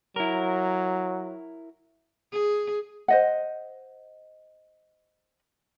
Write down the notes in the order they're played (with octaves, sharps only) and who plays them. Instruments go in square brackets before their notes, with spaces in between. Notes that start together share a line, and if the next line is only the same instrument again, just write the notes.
[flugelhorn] F#3 [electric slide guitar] E4 A#4
[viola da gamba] G#4
[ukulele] C5 D#5 F#5